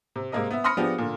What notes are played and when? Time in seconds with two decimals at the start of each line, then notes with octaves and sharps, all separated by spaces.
0.16 C3
0.32 C3 G#3 A#3 A#4 D#5
0.51 B3 E5
0.64 B5 C6 D#6 F6 A#6 C#7
0.77 F3 B3 D4 G4 G#4
0.98 A#2 D3